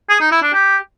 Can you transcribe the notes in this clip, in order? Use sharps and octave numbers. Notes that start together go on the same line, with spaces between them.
G#4
D#4
E4
D4
G4